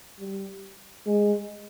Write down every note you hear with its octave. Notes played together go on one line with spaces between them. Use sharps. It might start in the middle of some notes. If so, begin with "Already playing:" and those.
G3
G#3